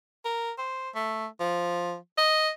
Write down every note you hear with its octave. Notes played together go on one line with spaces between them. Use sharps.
A#4
C5
A3
F3
D#5